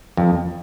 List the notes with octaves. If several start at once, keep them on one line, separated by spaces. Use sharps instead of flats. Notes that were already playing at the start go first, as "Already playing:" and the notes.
F2